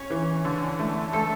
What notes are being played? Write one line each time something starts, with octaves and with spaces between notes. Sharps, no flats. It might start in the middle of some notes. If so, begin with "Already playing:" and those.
Already playing: C#4 C#5
E3
D3
A3
A3 A4